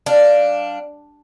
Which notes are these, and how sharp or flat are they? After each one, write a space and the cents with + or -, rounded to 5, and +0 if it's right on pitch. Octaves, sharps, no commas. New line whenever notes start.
G3 +0 D4 +0 F5 +0